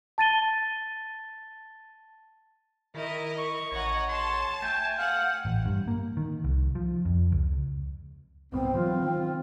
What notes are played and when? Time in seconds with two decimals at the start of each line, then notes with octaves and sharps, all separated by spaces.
0.18 A5 A6 D#7 G7
2.95 D#3 E4 A#4 D#5
3.38 C#6
3.72 A1 C#5 D#5 F#5 A#5
4.09 A5 C6
4.62 A3 G5 G#5
4.98 F5 F#5
5.45 A1
5.66 G2
5.88 A#3
6.17 D#3
6.44 C2
6.75 F3
7.05 F2
7.32 C#2
8.52 D1 C2 G#2 B3 C4
8.74 E3 F#3 F4
9.02 D#3